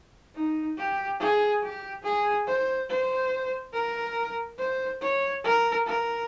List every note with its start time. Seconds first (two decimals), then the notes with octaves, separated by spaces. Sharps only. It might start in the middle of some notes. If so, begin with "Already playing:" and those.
0.35 D#4
0.78 G4
1.20 G#4
1.63 G4
2.04 G#4
2.47 C5
2.90 C5
3.73 A#4
4.58 C5
5.02 C#5
5.44 A#4
5.86 A#4